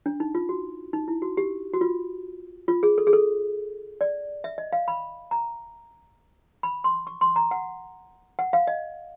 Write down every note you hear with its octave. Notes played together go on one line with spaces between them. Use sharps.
D4
D#4
F4
F#4
D#4
E4
F#4
G4
F#4
F4
F4
G#4
A4
G#4
A4
D5
E5
D#5
F5
B5
A#5
B5
C6
C#6
C6
A#5
F#5
F#5
F5
D#5